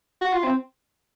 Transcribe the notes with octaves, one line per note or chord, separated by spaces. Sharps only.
F#4
F4
C4